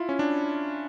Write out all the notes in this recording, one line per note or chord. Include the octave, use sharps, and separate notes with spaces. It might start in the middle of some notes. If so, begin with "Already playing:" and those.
Already playing: E4 F4
C#4
D4